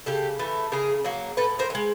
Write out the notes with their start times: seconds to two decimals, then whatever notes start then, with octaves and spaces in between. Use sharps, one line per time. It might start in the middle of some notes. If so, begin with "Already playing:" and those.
0.06 C#3 G4 A4
0.39 E3 A3
0.72 C#3 G#4 A#4
1.04 F#3 A#3
1.37 A2 A4 B4
1.59 A#4 C5
1.70 E3
1.75 G#3